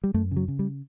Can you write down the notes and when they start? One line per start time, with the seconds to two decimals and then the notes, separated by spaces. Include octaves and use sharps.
0.04 G3
0.14 F#2 A3
0.31 C#3
0.37 F#3
0.48 C#3
0.59 G3